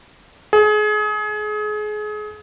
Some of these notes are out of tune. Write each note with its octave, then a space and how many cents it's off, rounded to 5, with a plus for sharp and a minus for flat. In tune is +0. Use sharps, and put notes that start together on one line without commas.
G#4 +30